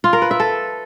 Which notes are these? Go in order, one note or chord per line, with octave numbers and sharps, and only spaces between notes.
F4
A#4
B4
E5
A4